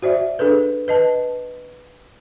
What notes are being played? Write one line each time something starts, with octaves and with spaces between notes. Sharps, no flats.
F#4 C5 D5 E5
D4 G#4 A4 B4
B4 D#5 A5